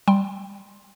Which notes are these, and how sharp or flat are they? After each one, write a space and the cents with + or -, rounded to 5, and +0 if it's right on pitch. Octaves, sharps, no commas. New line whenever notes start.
G3 +0 G5 +0 C6 +10